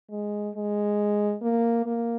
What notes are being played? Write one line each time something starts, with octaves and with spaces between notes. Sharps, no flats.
G#3
G#3
A#3
A#3